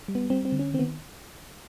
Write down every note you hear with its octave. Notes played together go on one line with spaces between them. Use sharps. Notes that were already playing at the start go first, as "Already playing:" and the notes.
G3
B3
G3 C4
C4
D3
C#4
D#3 C4
B3